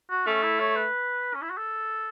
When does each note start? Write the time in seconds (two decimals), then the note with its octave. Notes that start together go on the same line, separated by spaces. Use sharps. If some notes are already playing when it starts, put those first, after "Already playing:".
0.10 F#4
0.27 A3 C#4
0.43 E4
0.60 C#5
0.76 B4
1.35 C#4
1.42 E4
1.50 F#4
1.57 A4